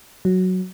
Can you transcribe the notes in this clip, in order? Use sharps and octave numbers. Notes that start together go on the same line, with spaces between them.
F#3